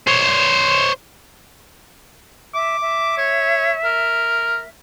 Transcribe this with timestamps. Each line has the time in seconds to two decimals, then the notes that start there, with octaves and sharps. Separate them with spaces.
0.07 C5 C#5
2.54 E5 D6
2.81 E5
3.18 C#5
3.84 A#4